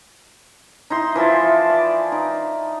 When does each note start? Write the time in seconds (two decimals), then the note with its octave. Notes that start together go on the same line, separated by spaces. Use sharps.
0.90 D#4 E4 C6
1.15 E3 F3 E5 A5
1.70 D5
2.12 D#4